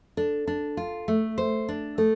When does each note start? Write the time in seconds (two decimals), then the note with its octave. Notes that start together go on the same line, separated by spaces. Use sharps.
0.17 D4 A4
0.47 D4
0.77 F4
1.08 A3
1.38 C5
1.69 D4
1.98 A3 A4